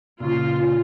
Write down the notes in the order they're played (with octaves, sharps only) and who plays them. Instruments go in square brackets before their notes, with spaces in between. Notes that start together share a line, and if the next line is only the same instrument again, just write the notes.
[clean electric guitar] A#2 C#3 [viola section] F4